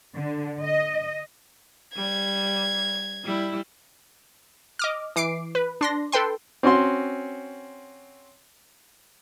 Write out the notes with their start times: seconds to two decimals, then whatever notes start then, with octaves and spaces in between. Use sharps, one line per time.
0.15 D3
0.61 D#5
1.96 G3 G#6
3.24 G3 E4
4.79 D#5 D6 F6
5.16 E3 D6 C7 D7
5.55 B4
5.81 D4 C6 A#6
6.12 A4 B4 G5 C6
6.63 C4 C#4 F#4 C6